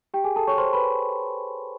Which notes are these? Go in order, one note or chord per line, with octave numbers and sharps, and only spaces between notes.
G4 G5
G#4 G#5
A4 A5
C#5 C#6
C5 C6
B4 B5